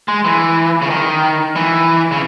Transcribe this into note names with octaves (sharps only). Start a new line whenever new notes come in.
G#3
E3
C#3
D#3
E3
C#3